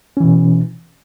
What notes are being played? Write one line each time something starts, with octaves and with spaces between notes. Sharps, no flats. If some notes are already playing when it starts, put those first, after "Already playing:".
B2 E3 C#4